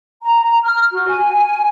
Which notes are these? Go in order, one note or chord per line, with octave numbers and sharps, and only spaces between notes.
A#5
F6
F#4
G#5